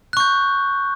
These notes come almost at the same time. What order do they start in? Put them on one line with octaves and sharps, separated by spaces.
F#6 C#6 G6